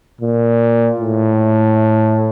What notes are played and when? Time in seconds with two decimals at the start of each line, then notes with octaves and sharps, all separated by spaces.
0.21 A#2
1.01 A2